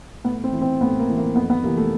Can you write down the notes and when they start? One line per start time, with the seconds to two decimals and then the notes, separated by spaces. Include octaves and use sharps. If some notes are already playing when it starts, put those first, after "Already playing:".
0.24 A2 B3
0.44 C4
0.52 E3
0.61 C4
0.81 A2 B3
0.99 A#3
1.08 E3
1.17 A#3
1.35 F2 B3
1.50 B3
1.63 C3 E3 A#3
1.77 A3